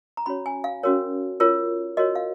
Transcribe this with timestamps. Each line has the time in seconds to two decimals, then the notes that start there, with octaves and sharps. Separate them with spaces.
0.17 A#5
0.26 C#4 F#4 C#5 B5
0.46 G#5
0.64 F5
0.83 C#4 F#4 A#4 C#5
1.40 F4 A#4 C#5
1.97 F#4 A#4 C#5 D#5
2.15 F5